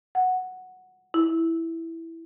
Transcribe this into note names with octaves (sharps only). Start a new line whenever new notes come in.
F#5
E4